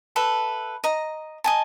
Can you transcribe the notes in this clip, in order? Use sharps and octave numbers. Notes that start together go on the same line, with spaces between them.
A4 B4 E5
D#5 A#5
D#5 G#5 A5